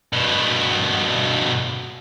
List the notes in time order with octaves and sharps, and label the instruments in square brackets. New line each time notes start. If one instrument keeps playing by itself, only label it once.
[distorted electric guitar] G2 B2